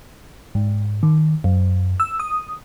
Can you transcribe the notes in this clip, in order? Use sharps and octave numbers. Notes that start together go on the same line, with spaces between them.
G#2
D#3
F#2
E6
D#6